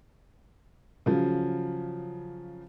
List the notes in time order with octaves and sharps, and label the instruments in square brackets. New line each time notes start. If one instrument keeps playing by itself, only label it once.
[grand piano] C#3 F3 F#3